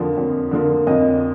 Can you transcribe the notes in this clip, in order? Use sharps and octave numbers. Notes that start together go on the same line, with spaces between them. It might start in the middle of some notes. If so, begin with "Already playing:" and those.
Already playing: F2 D3 F3 A#3
F2
D3 F3 A#3
F2 D#5